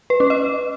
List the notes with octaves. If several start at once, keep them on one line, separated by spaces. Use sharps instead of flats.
B4
C#4
D#5